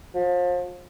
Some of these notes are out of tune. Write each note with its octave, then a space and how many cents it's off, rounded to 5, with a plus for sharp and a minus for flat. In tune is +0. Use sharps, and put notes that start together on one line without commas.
F3 +35